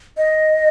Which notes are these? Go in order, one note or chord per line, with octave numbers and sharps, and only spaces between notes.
D#5